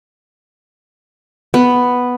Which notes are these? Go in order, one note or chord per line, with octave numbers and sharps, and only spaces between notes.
B3